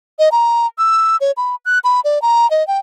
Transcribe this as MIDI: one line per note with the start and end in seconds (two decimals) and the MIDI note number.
0.19 0.29 75
0.32 0.67 82
0.78 1.17 88
1.21 1.31 73
1.37 1.55 83
1.65 1.79 90
1.84 2.00 83
2.04 2.21 74
2.22 2.49 82
2.51 2.66 75
2.68 2.79 79